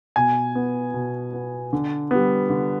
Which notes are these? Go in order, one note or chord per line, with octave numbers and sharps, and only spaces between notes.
B2 G#5
B3
B2
B3
D3
G3 B3
D3